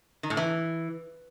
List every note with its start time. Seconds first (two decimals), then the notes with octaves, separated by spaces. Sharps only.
0.23 D#3
0.30 A2
0.37 E3